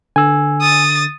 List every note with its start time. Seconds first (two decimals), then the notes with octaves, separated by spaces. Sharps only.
0.16 D3 G#5 E6
0.61 D#6 A6